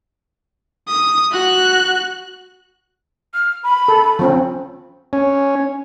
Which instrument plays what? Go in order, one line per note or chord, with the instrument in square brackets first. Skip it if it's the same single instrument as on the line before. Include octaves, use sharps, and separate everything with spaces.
[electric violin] D#6
F#4 F#6
[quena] F6
B5
[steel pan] A4
F3 C4 C#4
[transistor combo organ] C#4